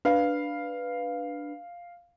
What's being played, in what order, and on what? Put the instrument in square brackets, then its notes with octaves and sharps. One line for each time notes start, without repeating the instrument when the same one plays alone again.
[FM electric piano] D4 B4 [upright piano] F5